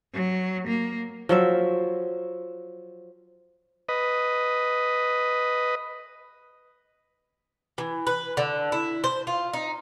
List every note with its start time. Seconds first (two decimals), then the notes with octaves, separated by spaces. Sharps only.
0.14 F#3
0.68 A#3
1.29 F3 F#3 E5
3.89 B4 D#5
7.78 E3
8.07 B4
8.37 D3
8.72 E4
9.04 C5
9.27 F4
9.53 D#4